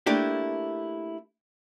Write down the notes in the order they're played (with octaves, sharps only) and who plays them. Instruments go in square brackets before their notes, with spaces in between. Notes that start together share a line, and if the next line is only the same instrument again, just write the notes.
[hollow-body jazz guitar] A3 A#3 D4 E4 G4